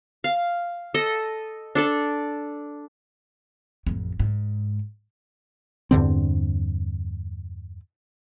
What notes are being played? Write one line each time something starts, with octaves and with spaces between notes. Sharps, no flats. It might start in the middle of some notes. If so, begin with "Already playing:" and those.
F5
A4 D#5
D4 A4 D5
A1 F2
G#2
E2 G2 D3 C4